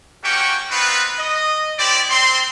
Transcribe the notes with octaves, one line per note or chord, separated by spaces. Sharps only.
A#3 C#4 F#4 G4 G5 C#6
B3 C4 D#4 F4 B4
D#5
E4 G4 C5 D5
C4 C6